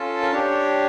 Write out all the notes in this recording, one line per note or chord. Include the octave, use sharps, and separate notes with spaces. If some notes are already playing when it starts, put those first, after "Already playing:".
Already playing: C#4 F4 A4 A5
A#4
D4 G4 C#5